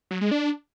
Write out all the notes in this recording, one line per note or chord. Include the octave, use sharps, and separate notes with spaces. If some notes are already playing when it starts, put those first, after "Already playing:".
F#3
G#3
D4